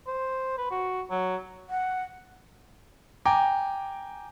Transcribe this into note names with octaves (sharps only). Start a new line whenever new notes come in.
C5
B4
F#4
F#3
F#5
G5 G#5 A#5 D6